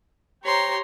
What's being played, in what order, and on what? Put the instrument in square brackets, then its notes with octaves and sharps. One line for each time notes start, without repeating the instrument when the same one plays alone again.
[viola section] G4 C5 A#5 [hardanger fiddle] C#5 C6